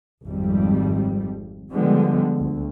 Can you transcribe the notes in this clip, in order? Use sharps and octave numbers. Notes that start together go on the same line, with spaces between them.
G#1 F2 G3
D3 F3 G3 G#3 B3
D2